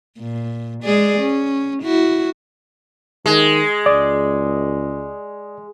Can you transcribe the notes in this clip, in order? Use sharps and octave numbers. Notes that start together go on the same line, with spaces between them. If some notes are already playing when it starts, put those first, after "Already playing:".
A#2
G#3 G#4 D5
C#4
E4 F#4
D#3 G#3
C#2 D5